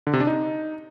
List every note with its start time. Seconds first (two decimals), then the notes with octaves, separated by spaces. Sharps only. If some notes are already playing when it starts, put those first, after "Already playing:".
0.07 D3
0.13 C3
0.20 D4
0.27 D#4